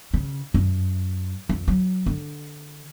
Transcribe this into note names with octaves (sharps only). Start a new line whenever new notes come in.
C#3
F#2
F2
F#3
D3